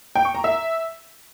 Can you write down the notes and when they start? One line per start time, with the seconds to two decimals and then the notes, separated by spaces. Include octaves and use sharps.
0.15 G5
0.25 C#6
0.35 A#5
0.44 E5